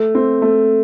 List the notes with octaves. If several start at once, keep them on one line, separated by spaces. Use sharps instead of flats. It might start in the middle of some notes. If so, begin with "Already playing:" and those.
Already playing: A3
C4
A3